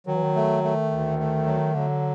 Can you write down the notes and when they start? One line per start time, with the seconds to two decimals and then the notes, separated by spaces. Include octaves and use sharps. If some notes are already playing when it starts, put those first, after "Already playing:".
0.07 D#3 F#3
0.15 E3
0.23 D#3
0.36 A3
0.64 A3
0.91 D2
1.19 A3
1.46 F#3
1.74 D3 F#3